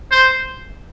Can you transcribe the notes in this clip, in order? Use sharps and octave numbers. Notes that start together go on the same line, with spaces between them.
C5